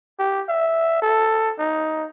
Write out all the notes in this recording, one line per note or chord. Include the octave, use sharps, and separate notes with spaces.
G4
E5
A4
D#4